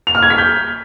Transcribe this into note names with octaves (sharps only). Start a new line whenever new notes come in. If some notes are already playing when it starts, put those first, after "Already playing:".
F7
F6
G#6
B6
G6